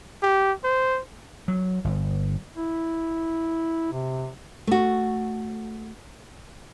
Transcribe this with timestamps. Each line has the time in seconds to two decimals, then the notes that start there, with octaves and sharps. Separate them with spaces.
0.22 G4
0.64 C5
1.48 F#3
1.84 G1
2.56 E4
3.92 C3
4.67 A3 F#4